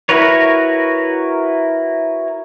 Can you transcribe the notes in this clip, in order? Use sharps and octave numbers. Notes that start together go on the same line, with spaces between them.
E4 F#4 A#4 B4 C#5